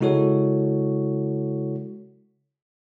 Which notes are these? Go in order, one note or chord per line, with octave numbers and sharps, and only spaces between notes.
C#3 G#3 E4 F#4 A4 C#5